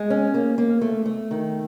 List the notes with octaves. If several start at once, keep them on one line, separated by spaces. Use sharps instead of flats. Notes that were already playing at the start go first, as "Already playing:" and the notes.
Already playing: G#3
C#4
A#3
A#3
A3
A3
D#3